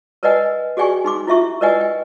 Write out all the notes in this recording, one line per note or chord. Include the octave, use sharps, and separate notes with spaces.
A#4 B4 D5 D#5 F#5 G#5
F#4 G#4 D5 G5 G#5 C#6
D#4 C6 D6
E4 F4 E5 C#6
A#4 B4 D5 D#5 F#5 G#5
G5